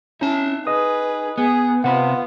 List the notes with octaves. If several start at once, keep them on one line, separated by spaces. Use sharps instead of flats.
C#4 D#4 E4 A5
G#4 B4 D#5 D#6
B3 G#4
C3 B3 F4 C5 F#5 B5